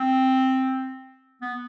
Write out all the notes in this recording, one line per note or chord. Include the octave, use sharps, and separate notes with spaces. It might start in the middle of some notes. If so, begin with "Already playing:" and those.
Already playing: C4
B3